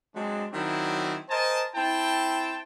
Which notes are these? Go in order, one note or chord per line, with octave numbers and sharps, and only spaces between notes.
F#3 G#3 C4 D4
D#3 F#3 C4 D4 E4
A#4 C5 D#5 G#5 A5
C4 E4 G5 A5